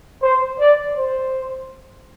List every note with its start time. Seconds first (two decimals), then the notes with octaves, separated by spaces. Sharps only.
0.22 C5
0.59 D5
0.97 C5